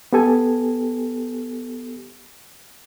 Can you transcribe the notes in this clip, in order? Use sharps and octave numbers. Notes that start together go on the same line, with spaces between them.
B3 G4 A4 G#5